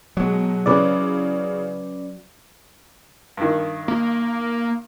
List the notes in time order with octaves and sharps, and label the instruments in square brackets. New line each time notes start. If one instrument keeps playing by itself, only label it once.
[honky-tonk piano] B2 G#3 [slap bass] F#3
[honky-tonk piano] C#3 E3 [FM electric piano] C#4 B4 D5
[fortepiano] G2 D#3
[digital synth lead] A#3